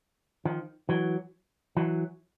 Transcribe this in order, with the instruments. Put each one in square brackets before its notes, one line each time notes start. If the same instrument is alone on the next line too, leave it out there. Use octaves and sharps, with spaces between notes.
[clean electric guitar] D#3 F3
E3 F#3
E3 F#3